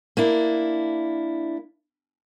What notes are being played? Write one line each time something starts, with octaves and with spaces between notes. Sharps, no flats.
A#3 D4 E4